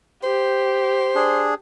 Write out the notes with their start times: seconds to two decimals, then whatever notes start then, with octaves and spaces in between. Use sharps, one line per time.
0.24 G4 C5
1.15 D4 G#4